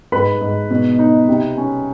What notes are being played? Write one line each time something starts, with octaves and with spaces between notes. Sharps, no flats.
G#2 B4 B5
G#2
B2
D#4
C3
C#4